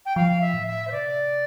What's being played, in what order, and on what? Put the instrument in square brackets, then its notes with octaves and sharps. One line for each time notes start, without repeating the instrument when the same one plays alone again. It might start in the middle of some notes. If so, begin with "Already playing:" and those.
[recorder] G5
[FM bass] F3 [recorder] F5
[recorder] E5
[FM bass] A2
[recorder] E5
C5
[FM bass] C3 [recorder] D5